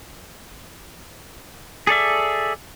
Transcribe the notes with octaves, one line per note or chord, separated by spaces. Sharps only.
G#4 A4 D5 E5